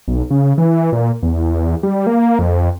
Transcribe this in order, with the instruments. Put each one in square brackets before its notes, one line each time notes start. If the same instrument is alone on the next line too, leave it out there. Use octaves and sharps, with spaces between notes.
[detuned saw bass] B1
C#3
E3
A#2
E2
G3
A#3
F2